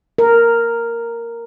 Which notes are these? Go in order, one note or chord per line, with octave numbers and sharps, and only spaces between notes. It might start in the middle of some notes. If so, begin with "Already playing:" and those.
A#4